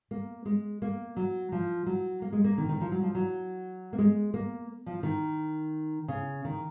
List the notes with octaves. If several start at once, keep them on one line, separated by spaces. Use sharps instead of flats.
A#3
G#3
A#3
F#3
F3
F#3
A#3
G#3
A#3
D#3
D#3
F3
F#3
F3
F#3
A#3
G#3
A#3
F3
D#3
C#3
D#3